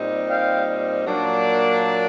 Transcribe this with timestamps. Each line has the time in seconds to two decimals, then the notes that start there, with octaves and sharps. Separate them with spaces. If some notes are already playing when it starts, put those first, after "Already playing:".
Already playing: A#2 G3 C4 D#4
0.28 F5 G5
1.06 A#2 F#3 A#3 D4